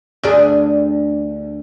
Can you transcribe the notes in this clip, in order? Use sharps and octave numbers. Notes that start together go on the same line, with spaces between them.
D2 D4 G#4